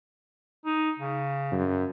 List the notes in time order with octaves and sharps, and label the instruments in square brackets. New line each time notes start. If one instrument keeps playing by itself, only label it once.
[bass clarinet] D#4
C#3
[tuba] F#2